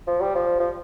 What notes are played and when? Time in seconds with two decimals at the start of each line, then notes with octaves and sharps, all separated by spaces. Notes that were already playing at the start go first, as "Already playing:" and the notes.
0.07 F3
0.21 G3
0.35 F3
0.60 F3